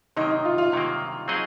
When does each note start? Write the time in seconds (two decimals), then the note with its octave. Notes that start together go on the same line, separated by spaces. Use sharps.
0.17 C3 D#3 F#3 A#3 D#4
0.31 D#4
0.45 F4
0.58 F4
0.72 C3 D#3 F#3 A#3
1.28 F#3 C4 D#4 G#4 D#5